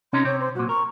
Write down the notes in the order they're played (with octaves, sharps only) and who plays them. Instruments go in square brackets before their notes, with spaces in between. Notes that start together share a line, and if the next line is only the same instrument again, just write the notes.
[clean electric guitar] C3 C#4 D#4 [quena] C6
[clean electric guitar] C3 C4 [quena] C#5
[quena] C5
[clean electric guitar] B1 A#2 [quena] F#4
[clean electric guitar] A#4 [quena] C#6